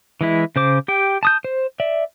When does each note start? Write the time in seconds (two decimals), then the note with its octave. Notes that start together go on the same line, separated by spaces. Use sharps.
0.21 E3 G#3 E4
0.56 C#3 C5 D6
0.88 G4 G5
1.23 A5 D#6 G6
1.45 C5
1.80 D5 E5